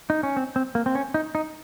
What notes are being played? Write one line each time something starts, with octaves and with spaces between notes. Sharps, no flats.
D#4
C#4
C4
C4
A#3
C4
C#4
D#4
D#4